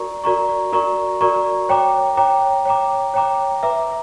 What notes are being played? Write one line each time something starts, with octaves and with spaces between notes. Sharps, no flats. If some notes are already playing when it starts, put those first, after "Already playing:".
Already playing: F#4 A#4 D5 A#5 C#6
F#4 A#4 D5 A#5 C#6
F#4 A#4 D5 A#5 C#6
F#4 A#4 D5 A#5 C#6
C#5 G5 A#5 D6
C#5 G5 A#5 D6
C#5 G5 A#5 D6
C#5 G5 A#5 D6
B4 E5 A#5 D6